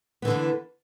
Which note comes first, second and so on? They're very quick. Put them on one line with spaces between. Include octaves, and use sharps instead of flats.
B3 E3 D3 A#3